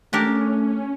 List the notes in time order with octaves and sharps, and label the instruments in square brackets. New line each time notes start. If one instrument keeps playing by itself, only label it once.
[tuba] A3 [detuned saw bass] C#4 [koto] D4 G4 A#4